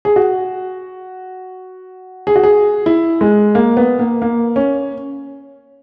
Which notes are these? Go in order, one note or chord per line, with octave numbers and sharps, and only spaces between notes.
G#4
F#4
G#4
F#4
G#4
E4
G#3
A#3
B3
A#3
A#3
C#4